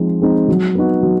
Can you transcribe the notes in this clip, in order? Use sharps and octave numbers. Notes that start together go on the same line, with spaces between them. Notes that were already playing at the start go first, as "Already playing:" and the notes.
Already playing: F3 G#3 C4 D#4
G#3 C4 D#4
F#3
B3 D#4 F#4
F#3